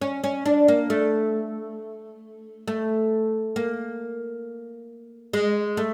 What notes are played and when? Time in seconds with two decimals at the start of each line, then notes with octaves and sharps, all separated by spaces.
0.01 C#4
0.24 C#4
0.46 D4
0.68 A#3
0.90 A3
2.68 A3
3.56 A#3
5.33 G#3
5.77 A3